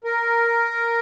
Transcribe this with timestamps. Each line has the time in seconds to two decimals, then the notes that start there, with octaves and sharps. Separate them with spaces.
0.04 A#4